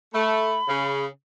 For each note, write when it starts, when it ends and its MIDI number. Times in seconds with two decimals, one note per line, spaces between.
0.14 0.57 57
0.14 1.04 83
0.68 1.05 49